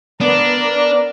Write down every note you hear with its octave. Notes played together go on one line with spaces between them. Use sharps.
B3 D4 A#4 D5